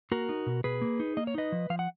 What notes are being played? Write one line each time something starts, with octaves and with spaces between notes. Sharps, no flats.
A#3 F#4 A#4
D#4
B2
B2 G#4 B4
A#3
D#4
A#3 D#5
C#5
D#4 B4 D#5
F3
F3 F5
F#5